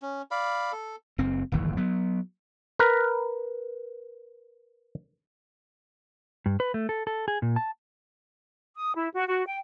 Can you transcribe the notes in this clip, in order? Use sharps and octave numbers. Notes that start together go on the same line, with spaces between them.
C#4
D5 F5 B5
A4
F#1 C4
D1 G1 D#2 E3
F#3 B3
A#4 B4
G2
B4
A3
A4
A4
G#4
A#2
A5
D#6
E4
F#4
F#4
G5